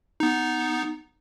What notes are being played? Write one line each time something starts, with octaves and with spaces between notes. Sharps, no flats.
B3 D#4